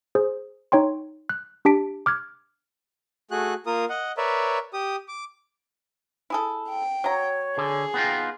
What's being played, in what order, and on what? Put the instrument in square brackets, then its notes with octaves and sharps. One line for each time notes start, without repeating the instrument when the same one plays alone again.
[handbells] G#4 C5
D#4 C#5 G5 C6
F#6
D4 G4 A5 B6 D7
D6 F6 F#6 G#6
[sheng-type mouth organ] A3 F#4 G#4 F#6
A#3 F4 A#4 D#6
D#5 F#5
A#4 B4 C#5 D5 E5
G4 D#6
D6
[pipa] E4 G#4 A4
[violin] G5
[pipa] F#3 A#5 [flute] C#5
[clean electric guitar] D3 [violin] G#4
[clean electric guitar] B3 D#4 F4 [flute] G5